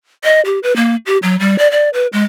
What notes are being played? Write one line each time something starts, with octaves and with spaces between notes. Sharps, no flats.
D#5
G4
B4
A#3
G4
F#3
G3
D5
D5
B4
G#3